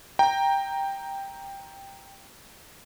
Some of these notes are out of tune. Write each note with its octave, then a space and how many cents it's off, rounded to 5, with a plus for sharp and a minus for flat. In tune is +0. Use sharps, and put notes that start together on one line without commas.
G5 +5 A#5 +0